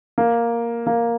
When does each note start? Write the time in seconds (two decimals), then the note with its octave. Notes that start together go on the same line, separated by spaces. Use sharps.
0.18 A#3
0.87 A#3